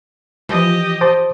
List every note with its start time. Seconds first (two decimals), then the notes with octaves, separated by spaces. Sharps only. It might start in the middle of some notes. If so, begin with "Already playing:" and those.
0.49 E3 F3 G4 D#5
1.01 C5 A5 D6